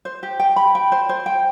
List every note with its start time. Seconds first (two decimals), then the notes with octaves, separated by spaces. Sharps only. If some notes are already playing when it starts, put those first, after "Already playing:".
0.05 C5
0.23 G4
0.40 G5
0.56 B5
0.75 G5
0.92 C5
1.09 C5
1.26 G5